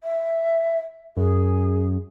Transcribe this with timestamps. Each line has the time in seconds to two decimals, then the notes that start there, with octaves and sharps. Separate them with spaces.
0.03 E5
1.17 F#2 G#4